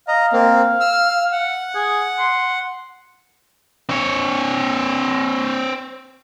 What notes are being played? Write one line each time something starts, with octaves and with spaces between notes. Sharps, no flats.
D#5 F5 A#5
A#3 C4
E6 F6
F#5
G#4
C6
C4 C#5